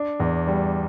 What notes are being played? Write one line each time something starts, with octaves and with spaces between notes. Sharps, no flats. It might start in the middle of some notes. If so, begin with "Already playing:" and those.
Already playing: D4
E2
G3